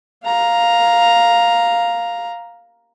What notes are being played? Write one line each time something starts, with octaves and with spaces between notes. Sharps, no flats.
F5 A#5